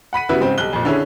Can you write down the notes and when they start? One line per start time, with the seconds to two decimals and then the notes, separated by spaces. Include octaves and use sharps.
0.13 F#5 B5 B6 D#7
0.29 C#3 G3 B3 E4 F#4 B4
0.41 G#2 C#3 C4 C5
0.58 B1 G3 F#6 G7
0.73 F2 A#2
0.85 D3 C#4 E4 G#4